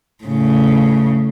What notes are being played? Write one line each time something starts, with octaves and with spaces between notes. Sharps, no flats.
A2 C#3